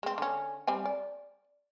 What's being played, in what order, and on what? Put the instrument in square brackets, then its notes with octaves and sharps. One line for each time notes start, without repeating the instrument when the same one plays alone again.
[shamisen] G#3 C4
D3 C#4
G3 C4 G#5
D5